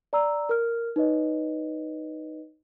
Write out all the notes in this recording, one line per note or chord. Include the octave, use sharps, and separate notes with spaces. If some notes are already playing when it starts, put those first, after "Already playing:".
D5 A#5 E6
A#4 F6
D#4 B4 C#5 D#5